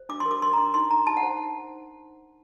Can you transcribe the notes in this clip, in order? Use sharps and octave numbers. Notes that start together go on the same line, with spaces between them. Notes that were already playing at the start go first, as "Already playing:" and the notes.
Already playing: C5
D4 D6
C6
A#4
D6
A#4 C6
A#5
D4 C6
D#4 C6
D#4 A#5
D#4 A5
F#5
C5